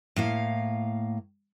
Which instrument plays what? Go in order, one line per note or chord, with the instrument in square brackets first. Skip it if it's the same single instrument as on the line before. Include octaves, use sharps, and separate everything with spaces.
[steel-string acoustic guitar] A2 A#3 F5